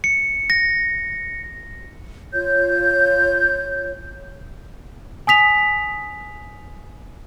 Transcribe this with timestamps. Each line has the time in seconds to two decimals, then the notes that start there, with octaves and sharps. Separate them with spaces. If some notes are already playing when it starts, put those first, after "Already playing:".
0.04 C#7
0.50 A#6
2.33 F4 C#5 G6
5.27 G#5 D#6 B6 F7